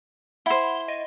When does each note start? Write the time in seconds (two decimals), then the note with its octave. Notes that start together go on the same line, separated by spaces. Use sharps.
0.46 E4 C5 F#5 B5 G7
0.88 D#5 A#6 D#7